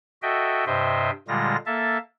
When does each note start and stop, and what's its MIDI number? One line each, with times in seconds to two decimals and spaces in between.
0.22 0.65 66
0.22 0.65 69
0.22 0.65 75
0.22 0.65 76
0.22 0.65 79
0.66 1.11 43
0.66 1.11 48
0.66 1.11 72
0.66 1.11 75
0.66 1.11 76
0.66 1.11 79
1.28 1.56 46
1.28 1.56 50
1.28 1.56 55
1.28 1.56 56
1.28 1.56 65
1.28 1.56 94
1.66 1.98 58
1.66 1.98 69
1.66 1.98 76
1.66 1.98 81